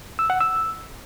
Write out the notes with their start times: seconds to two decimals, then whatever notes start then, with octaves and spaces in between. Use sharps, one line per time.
0.19 E6
0.30 F#5
0.41 E6